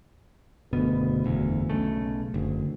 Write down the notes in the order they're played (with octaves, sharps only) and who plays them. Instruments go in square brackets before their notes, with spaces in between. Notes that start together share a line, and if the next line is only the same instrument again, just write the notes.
[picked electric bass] F#1 B2 B3 [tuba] D2
[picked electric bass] F#1 E2
B1 C#3 A3
[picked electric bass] F#1 [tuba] D2